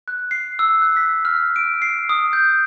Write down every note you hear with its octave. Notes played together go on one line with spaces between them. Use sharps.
F#6
C7
E6
F#6
B6
F6
D7
C7
D#6
G6